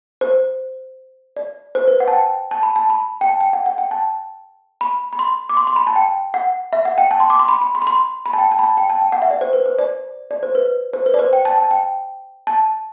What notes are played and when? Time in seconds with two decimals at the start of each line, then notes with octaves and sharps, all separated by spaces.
0.21 C5
1.37 D5
1.75 C5
1.88 B4
2.00 F#5
2.08 A5
2.13 G5
2.51 A5
2.63 B5
2.76 A5
2.90 B5
3.21 G5
3.28 A5
3.41 G5
3.53 F#5
3.66 F#5
3.78 G5
3.91 A5
4.81 B5
5.13 B5
5.19 C6
5.49 D6
5.57 C6
5.67 C6
5.76 B5
5.87 A5
5.96 G5
6.34 F#5
6.73 E5
6.85 F#5
6.98 G5
7.11 A5
7.20 C6
7.30 D6
7.39 C6
7.48 B5
7.61 B5
7.75 C6
7.82 B5
7.87 C6
8.26 B5
8.33 A5
8.38 G5
8.52 A5
8.59 B5
8.63 A5
8.77 G5
8.90 A5
9.02 G5
9.12 F#5
9.22 E5
9.31 D5
9.41 C5
9.53 B4
9.66 C5
9.79 D5
10.31 D5
10.43 C5
10.55 B4
10.93 C5
11.06 B4
11.14 D5
11.19 C5
11.33 G5
11.45 A5
11.58 A5
11.71 G5
12.47 A5